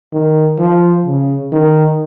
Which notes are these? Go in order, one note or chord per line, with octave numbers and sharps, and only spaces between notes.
D#3
F3
C#3
D#3